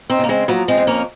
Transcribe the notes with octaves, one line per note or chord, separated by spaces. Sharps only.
C4 D#4
C#3 A#3
G#3 C4
F3 F#3 A#3
G#3 C4
F2
A#3 C#4